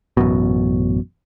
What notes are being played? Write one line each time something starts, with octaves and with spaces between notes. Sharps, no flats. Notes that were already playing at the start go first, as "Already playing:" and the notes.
A1 F#2 B2